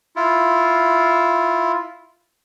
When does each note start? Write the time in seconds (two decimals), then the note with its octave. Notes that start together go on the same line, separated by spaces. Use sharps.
0.16 E4 F4